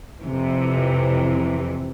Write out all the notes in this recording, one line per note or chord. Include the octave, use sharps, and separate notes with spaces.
F2 C3 E3